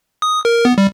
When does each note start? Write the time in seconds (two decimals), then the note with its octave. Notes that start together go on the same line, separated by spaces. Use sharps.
0.22 D#6
0.45 A#4
0.65 B3
0.78 G3